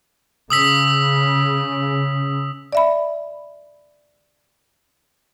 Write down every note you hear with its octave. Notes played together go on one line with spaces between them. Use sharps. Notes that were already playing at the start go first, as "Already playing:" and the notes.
C#3 D#6 E6 B6
D5 E5 B5